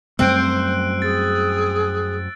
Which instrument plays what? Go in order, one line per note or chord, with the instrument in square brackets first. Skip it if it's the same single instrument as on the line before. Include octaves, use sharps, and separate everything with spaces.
[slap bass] F#2 G3 A3 [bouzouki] C4 [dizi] C5 [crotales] E6 F#6 D7
[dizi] G#4 [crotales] A6